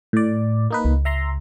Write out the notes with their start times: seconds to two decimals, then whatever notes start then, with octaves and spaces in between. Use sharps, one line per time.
0.13 A2 D5
0.71 A#3 D#4 B4
0.84 C#2
1.05 E5 A#5 C6